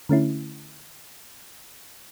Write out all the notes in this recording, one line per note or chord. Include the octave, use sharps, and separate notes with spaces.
D3 A3 C#4 E4